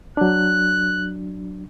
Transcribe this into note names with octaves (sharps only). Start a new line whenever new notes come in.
F#3 D4 F#6